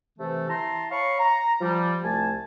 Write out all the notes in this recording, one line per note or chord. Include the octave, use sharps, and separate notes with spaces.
C3 E3 A3
E4 A5 A#5 C6
C#5 F5 B5 C#6
A#5
F3 G3
C2 A3 G#5 A5